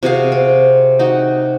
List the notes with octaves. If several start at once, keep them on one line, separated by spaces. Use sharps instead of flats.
C3 F#4 G#4 F5
C4
D#4 F#4